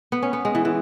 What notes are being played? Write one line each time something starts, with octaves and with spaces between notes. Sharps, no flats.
B3
C#4
B3
G#3
E3
E3